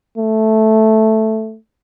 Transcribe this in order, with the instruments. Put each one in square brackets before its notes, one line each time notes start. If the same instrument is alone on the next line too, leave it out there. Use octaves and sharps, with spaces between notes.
[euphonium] A3